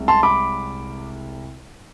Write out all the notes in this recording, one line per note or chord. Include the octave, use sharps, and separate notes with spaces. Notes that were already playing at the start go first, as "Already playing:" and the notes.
Already playing: C2 C3 G#3
A5 C6
B5 D6